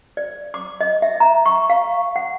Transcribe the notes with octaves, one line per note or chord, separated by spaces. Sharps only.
D5
D6
D#5
E5
A#5
C#6
F5
F#5